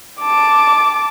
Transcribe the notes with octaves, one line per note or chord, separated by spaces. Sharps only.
A5 D6